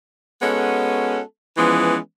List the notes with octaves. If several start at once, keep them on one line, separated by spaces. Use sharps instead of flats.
G#3 B3 C#4 F#4 A4
E3 F3 G#3 B3 C#4